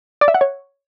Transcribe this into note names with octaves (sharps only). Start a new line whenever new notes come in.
D5
E5
F#5
C#5